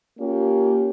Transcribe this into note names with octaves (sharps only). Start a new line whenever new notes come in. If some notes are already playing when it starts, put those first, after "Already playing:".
A#3 C#4 F4 G4